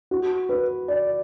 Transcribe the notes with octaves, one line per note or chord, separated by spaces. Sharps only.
F#4
B4
D5